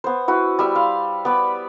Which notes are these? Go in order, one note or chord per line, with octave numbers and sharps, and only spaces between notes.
B3 C5
E4 F#4 B4
G3 E5 B5
F5 C6
B3 D5 B5